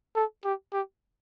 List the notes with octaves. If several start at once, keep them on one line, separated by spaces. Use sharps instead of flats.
A4
G4
G4